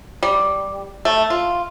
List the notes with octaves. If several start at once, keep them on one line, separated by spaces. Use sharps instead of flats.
G3
A3
F4